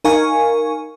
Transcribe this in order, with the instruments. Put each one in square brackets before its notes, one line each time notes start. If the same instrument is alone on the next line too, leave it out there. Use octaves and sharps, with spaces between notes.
[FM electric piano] D#4 A#4 F5 G#5 C#6